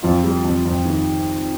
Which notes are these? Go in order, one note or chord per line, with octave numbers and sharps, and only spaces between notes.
F2 F4
G3
F2
F2
D#3